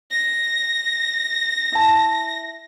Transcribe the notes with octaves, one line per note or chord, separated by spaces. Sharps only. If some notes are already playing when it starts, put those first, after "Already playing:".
A#6
E4 A5